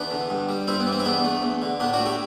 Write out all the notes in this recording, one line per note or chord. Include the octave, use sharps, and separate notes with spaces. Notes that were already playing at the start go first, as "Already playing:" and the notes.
Already playing: E2 B3 D4
D3
G2
G3
G2 C4 E4
B3
E3
C4
E4
E2 B3 D4
A3
E2
D3
A2 B3 D4
D4 F#4
A3
E4 G4